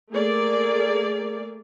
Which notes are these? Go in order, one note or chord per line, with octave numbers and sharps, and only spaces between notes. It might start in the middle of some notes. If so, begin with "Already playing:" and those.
A3 A#3 G#4 A#4 D5